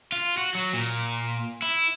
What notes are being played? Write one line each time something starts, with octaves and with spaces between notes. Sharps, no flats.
F4
F#4
F#3
A#2
E4